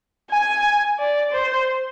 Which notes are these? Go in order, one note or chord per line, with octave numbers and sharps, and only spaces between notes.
G#5
D5
C5